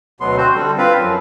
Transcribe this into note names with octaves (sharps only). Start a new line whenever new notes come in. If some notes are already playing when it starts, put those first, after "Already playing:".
D2 B2 F#3 B3 C6
C4 F#4 C5
D3 G3
C4 F4 B4 F5
F#2 F3 F#3